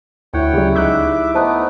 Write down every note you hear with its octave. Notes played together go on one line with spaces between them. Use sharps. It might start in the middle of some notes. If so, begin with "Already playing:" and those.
D2 E4 C#5 F#5 G5
C#3 F#3 G4 G#4 D5
C#2 D#4 E5 D6 F#6
A3 B3 D#4 C5 A5 F#6